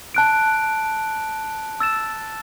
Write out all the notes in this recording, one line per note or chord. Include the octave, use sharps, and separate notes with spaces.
A5 F#6 D7
E6 A6 E7